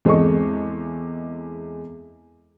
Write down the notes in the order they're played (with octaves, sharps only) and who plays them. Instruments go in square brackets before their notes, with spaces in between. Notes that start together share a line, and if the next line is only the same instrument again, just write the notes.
[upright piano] E2 G#3 C4 A4 D#5 C#6